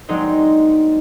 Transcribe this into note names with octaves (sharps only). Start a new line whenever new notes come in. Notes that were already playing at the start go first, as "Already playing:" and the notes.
F#3 G#3 A#3 C4 D4 D#4